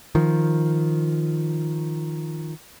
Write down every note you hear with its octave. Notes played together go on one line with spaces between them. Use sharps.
D#3 F3